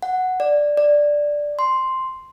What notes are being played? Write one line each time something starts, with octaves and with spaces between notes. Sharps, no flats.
F#5
D5
D5
C6